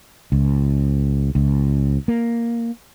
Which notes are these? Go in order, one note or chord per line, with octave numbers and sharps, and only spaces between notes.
C#2
C#2
A#3